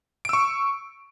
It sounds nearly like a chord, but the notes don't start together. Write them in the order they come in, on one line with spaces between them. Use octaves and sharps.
D7 E6 C#6